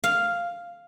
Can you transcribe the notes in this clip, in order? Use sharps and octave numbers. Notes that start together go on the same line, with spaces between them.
F5